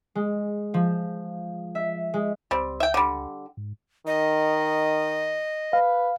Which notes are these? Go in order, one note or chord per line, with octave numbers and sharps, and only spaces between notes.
G#3
F3
E5
G#3
C#2 G3 C4
E5 G5
D3 G3
G#2
D#3 D#5
B4 F5